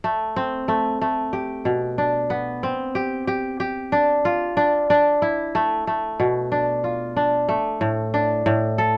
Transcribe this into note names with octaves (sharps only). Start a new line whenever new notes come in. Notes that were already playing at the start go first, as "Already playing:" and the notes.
A3
C4
A3
A3
G4
B2
D4
B3
C4
G4
G4
G4
D4
F4
D4
D4
E4
A3
A3
B2
D4
F4
D4
A3
A2
D4
A2
A4